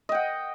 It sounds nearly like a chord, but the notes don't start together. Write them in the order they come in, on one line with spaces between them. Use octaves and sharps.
D#5 G5 F#5